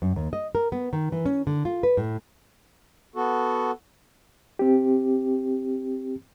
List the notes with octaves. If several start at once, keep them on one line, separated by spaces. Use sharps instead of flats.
F#2
D#2
D#5
A#4
B3
D#3
E3
C#4
D3
F4
B4
A2
B3 F#4 A4
C4 G4